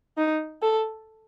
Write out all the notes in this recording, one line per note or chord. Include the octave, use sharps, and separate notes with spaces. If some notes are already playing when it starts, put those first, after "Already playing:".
D#4
A4